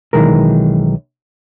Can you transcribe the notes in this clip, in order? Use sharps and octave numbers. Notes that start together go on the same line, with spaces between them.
B1 G2 D#3 E3 G#3 A#4